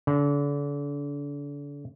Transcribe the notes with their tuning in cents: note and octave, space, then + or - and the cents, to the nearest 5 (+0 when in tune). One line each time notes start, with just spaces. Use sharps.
D3 -35